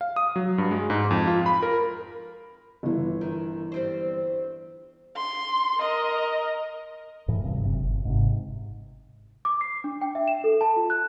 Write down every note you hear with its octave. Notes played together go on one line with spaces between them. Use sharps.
F5
D#6
F#3
G2
G#3
G#2
F2
F4
B5
A#4
G1 E3
D#3
G3 C4 C5
C6
A#4 D#5
F#2 A2 E3
D#1 G2 C3
F#1 F#2 C3
G1
G#2 C3
D6
C7
D4
G5
E5
E7
A4
A5
F4
F#6